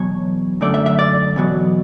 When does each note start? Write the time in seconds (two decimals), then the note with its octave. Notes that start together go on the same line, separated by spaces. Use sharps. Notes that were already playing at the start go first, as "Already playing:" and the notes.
Already playing: E2 B2 F#3 C#5
0.61 F#2 D3 A3 D5
0.74 E5
0.86 E5
0.99 D5
1.36 E2 B2 F#3